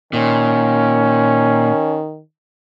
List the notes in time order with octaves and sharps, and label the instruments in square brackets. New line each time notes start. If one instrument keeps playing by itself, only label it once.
[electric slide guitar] A#2 [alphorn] D#3 [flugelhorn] C#4